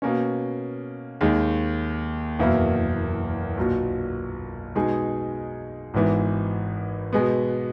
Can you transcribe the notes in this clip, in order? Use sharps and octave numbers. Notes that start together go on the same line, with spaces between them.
B2 A#3 C#4
D#2 D#3 G#3
F#1 E2 B2 A#3 E4
B1 A#2 F#3
B2 G#3 D#4 G#4
G#1 G#2 E3 B3
B2 G#3 B3